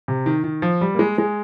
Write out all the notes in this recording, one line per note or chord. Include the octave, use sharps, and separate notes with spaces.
C3
D#3
D#3
F3
G3
A#3
G#3
G#3